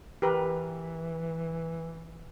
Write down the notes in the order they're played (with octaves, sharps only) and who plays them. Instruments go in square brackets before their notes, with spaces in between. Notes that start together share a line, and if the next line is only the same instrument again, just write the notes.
[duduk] E3 [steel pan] G4 A#4 B4